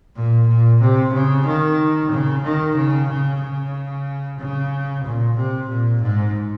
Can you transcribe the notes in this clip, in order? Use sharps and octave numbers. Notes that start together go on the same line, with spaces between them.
A#2
A#2
C3
C#3
D#3
C#3
D#3
C#3
C#3
C#3
C#3
A#2
C3
A#2
G#2